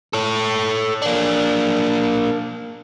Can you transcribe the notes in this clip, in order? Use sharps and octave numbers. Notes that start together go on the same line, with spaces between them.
A4 C#5
A#3 D4